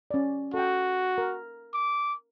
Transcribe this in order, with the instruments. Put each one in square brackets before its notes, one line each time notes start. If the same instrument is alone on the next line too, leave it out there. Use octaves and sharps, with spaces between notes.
[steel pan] C#4 D5
[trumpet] F#4 [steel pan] A4 G5
[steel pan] A#4
[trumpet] D6